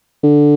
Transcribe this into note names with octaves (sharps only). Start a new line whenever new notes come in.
D3